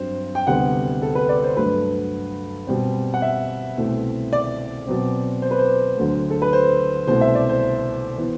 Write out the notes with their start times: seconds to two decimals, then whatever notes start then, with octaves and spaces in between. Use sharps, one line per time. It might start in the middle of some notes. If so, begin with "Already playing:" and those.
Already playing: G2 F#3 C4 C5
0.35 G5
0.47 D2 C3 G3 B3 F#5
1.02 A4
1.15 B4
1.29 D5
1.43 C5
1.56 G2 F#3 A3 B4
2.67 B2 G3 C4
3.14 F#5
3.22 E5
3.77 C2 B2 A3 C4
4.33 D5
4.87 B2 F#3 C4
5.42 C5
5.51 B4
5.59 C5
5.97 D2 D3 F#3 A3
6.30 A4
6.42 B4
6.53 C5
7.07 C2 B2 A3 C4 C5
7.21 E5
7.35 D5
7.49 C5
8.18 E3 B3